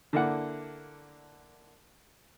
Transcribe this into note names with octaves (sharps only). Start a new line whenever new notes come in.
D3 A#3 D4 E4 F#5